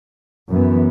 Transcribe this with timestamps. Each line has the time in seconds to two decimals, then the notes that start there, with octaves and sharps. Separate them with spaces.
0.50 F#2 E3 B3